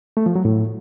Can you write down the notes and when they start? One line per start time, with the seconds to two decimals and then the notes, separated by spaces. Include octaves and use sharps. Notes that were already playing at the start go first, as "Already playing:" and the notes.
0.17 A3
0.26 F3
0.36 F#3
0.45 A2